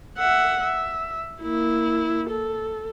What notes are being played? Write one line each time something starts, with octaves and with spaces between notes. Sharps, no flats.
E5 F#5
E5
A#3 E4
A4